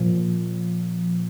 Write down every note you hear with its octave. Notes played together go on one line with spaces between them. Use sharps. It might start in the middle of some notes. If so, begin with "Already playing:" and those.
Already playing: A#2 F3